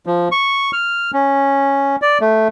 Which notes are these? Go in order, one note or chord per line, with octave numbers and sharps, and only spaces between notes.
F3
C#6
F6
C#4
D5
A3